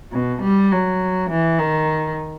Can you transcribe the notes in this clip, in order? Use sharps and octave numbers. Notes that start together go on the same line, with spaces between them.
B2
G3
F#3
E3
D#3